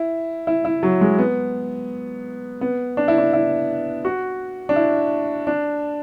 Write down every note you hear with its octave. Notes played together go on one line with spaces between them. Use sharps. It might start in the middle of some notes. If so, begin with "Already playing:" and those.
Already playing: E4
E4
E4
F#3
G#3
B3
B3
D4
E4
D4
E4
F#4
D4
E4
D4